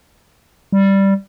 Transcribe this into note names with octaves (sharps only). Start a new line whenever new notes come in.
G3